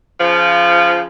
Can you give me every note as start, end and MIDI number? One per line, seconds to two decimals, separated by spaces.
0.20 1.05 49
0.20 1.05 53